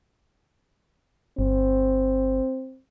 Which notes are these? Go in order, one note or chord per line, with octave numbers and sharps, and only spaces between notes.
G1 C4